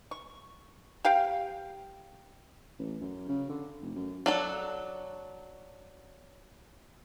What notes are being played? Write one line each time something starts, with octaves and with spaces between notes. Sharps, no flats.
C#6
G4 F5 G5
A1
F#2
C#3
D3
F1
F#2
F#3 D4 A4